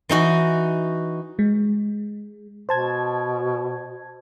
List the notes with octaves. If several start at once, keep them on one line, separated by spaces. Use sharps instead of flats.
E3 D#4 F#4
G#3
B2 C5 A5 G#6